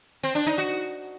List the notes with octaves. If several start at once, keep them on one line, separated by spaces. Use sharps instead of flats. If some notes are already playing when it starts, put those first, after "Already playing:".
C4
D4
D#4
F#4